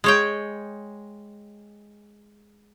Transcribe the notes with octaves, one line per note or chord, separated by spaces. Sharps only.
G#3 C#5 G5